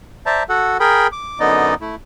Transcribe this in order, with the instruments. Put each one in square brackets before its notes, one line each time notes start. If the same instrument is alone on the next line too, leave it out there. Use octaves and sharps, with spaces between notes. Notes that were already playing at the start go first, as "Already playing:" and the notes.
[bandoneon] C5 D5 E5 A5 A#5
F#4 A4 F#5
G#4 A#4 G5 B5
D6
F#2 D3 B3 D#4 D5 D#5
A3 E4